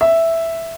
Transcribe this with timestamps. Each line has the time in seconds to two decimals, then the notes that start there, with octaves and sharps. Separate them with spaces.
0.01 E5